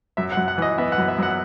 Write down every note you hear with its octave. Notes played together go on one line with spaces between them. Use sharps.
F#2 E5
F#5
F#2
F#5
E3 D#5
B3 E5
F#5
F#2
E5
F#2 F#5